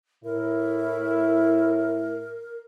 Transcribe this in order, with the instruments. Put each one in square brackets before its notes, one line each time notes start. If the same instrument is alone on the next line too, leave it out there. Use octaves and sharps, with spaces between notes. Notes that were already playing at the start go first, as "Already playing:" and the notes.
[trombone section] A2 E4 [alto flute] A#4